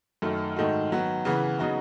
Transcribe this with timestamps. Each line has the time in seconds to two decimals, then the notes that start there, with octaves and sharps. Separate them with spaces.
0.22 F#2 D#3 A3
0.56 G#2 D#3 A3 D#4 F#4
0.91 D#3 F#3 B3
1.25 C#3 E3 B3
1.59 C#3 F#3 B3 D#4 F#4